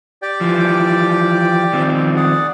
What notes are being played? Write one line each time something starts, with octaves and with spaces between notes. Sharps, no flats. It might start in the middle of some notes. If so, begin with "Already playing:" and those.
G4 D5 G5
E3 F3
D#3 F3 C4
G#4 D5 F#5